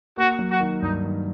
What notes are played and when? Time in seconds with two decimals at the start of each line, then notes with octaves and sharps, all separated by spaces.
0.17 A#3 F#4
0.39 F#3
0.50 F#4
0.61 D#3
0.82 G2 D#4
1.04 D#3